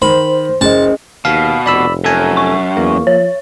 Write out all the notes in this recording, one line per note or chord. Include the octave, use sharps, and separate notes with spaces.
D#3 C5 B5
F#1 C#4 G#4 D#5 A5
D#2 B2 F5
F1 D5 B5 E6
F#2 A4 G#5
C#6
E2 A#3
F3 C#5